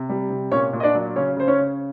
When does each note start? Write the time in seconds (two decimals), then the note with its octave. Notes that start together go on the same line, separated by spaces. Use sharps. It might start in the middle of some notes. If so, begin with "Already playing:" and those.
Already playing: C3
0.09 G3
0.30 C3
0.52 A#2 C#4 C#5
0.73 A#2
0.80 D#5
0.83 D4 D5
0.95 F#3
1.16 C#3 C#4 C#5
1.37 C#3 C5
1.48 C#4 C#5
1.59 C#3